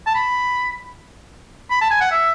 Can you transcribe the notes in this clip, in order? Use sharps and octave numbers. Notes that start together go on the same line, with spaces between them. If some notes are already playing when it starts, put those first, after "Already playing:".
A5
B5
B5
A5
G#5
F#5
E5